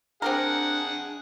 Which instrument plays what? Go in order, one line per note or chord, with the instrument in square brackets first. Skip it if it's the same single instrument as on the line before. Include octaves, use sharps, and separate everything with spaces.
[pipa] C4 G4 A#4 [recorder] D4 [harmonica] G#4 F#5